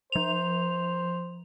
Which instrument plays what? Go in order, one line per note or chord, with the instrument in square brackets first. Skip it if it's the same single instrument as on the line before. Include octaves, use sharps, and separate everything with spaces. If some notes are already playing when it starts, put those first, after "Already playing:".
[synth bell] F3 F7 [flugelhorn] C5